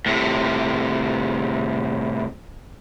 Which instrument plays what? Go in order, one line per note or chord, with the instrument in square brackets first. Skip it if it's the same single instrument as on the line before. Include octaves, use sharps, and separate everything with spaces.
[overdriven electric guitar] A2 C3